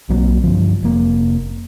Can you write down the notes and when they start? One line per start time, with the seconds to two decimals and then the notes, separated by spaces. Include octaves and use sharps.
0.09 B1 F#3 A#3 C4
0.44 G2 D3 F3
0.83 F1 A#3